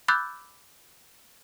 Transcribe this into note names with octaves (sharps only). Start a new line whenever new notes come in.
B5 D6 E6 F#6 G6 A6